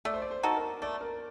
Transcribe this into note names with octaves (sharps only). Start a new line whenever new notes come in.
A3 D5
C5
D5
C5
D#4 F#4 A4
A#4
A3 D5
A#4